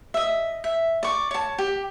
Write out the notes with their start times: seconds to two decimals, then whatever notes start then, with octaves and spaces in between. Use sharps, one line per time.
0.14 D#5 E5
0.64 E5
1.03 D5 C#6
1.31 C#5 A5
1.58 G4